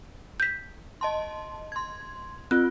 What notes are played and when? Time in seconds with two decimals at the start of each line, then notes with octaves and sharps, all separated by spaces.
0.40 G6 B6
1.01 D#5 A5 C6
1.72 C6 G#6
2.51 C4 F4 F#6